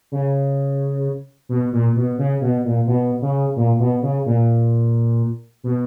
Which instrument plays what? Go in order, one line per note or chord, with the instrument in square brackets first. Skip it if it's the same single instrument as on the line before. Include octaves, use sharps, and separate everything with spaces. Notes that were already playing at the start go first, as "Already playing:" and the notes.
[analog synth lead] C#3
B2
A#2
B2
C#3
B2
A#2
B2
C#3
A#2
B2
C#3
A#2
B2